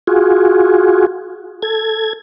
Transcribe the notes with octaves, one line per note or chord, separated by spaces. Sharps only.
F4 F#4 G#4
A4 G#6